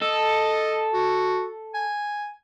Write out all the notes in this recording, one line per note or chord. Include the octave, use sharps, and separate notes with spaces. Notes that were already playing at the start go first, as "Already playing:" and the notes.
A4 D#5
F#4
G#5